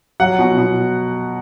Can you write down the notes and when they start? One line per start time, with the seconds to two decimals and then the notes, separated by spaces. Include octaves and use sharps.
0.20 F#3 F#5
0.39 B2
0.58 B2